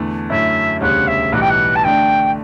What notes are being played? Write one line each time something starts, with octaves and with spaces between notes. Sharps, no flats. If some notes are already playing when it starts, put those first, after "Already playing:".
Already playing: E2 D3 A3
F#2 D3 A3 C#4 E4 E5
E1 D2 C#3 G3 C#4 F#5
E5
B1 A2 E3 G3 B3 F#5
G5
F#5
A5
D3 A3 D4 G5